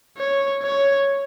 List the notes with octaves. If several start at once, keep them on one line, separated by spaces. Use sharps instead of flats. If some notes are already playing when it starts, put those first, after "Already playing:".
C#5
C#5